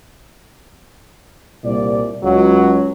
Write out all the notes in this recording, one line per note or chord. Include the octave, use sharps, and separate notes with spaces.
C2 A#2 D5
C#2 F#3